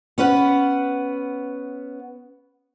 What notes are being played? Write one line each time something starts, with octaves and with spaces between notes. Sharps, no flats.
B3 C#4 B4 F#5